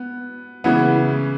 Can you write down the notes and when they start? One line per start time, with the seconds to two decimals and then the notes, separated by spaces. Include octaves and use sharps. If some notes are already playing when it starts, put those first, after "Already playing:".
Already playing: B3
0.64 C#3 E3 B3